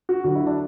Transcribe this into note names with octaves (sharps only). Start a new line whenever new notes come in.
F#4
D2 D3 F#3 F#4
E4
D4